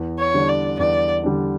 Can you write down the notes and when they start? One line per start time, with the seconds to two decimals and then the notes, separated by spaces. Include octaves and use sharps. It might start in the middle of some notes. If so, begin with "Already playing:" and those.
Already playing: E2
0.19 C#5
0.34 D3 G3 D4
0.49 D5
0.79 E2 D5
1.24 D3 G3 D4